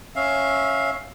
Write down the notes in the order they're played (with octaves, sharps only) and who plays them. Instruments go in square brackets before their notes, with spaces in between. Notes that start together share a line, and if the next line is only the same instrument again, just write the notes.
[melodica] C#4 E5 F5